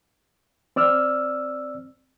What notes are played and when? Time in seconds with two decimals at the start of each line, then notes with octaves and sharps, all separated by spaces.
0.76 C4 D5 E6 F6